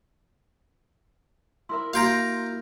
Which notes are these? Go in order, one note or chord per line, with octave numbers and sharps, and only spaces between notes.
E4 A#4 E5 C6
A#3 F#4 F5 G5 A#5 C6